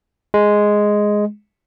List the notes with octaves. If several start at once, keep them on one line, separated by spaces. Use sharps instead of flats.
G#3